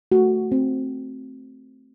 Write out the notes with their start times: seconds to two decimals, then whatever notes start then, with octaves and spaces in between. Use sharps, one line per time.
0.12 A3 F#4
0.52 C4